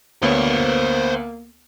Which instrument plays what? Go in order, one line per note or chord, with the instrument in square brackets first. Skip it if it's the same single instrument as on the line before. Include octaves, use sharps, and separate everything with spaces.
[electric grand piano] D2 B3 [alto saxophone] A#3 [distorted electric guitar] C5 C#5